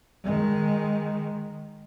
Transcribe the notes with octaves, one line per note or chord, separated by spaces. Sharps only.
D#3 G#3